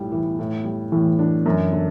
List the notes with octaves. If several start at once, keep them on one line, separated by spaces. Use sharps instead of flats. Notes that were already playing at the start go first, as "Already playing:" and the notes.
Already playing: B1 A2 G3
E3
A2
G3
A2 E3
D4
F#2
D3